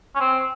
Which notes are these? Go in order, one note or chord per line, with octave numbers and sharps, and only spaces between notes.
C#4
C4